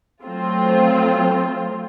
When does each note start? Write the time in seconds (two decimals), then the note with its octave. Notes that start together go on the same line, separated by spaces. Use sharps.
0.24 F#3 A3 C4 F4